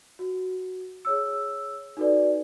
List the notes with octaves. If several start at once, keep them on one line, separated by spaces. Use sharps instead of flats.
F#4
G#4 C#5 E6
D#4 F#4 A4 B4 D5